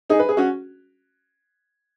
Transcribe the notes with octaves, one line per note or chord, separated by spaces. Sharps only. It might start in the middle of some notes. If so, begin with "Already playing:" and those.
D#4 G#4
B4
G#4
C#4 F#4